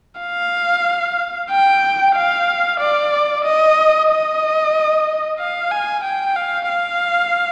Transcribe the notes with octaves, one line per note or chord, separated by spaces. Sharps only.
F5
G5
F5
D5
D#5
D#5
F5
G#5
G5
F5
F5